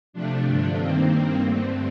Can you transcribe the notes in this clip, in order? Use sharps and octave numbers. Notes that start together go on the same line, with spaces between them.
C3 F3 A3 D4
G2 D3 F3 A3 D4
G2 D#3 A#3 C4
G2 D#3 A#3
G2 D3 A3 C4